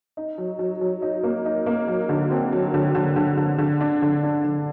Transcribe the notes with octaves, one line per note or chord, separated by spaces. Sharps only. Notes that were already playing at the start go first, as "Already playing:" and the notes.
D#4
F#3
F#3
F#3
D#4
A#3
D#4
A#3
F#3
D3
C4
F#3
D3
D3
D3
D3
D3
D4
D3
D4
D3